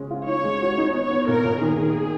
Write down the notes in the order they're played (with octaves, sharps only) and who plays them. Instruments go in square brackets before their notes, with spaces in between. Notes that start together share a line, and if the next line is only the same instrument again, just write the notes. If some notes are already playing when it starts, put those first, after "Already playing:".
Already playing: [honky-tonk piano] C#3 G#3 C#4
F4
[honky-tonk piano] D#4 [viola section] C#5
[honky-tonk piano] G#3
F#4
D#4
[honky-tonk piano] B3 [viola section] C#5
[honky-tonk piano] B3
[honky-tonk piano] A#2 [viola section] A#4
[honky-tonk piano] A#2
[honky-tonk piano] D#3 [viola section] G#4
[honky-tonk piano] D#3